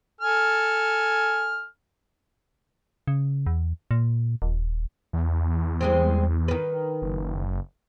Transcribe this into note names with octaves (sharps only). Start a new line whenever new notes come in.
A4 G#5 F6
C#3
E2
A#2
D#1
E2
G3 G#3 C4
D#3 B4
F#1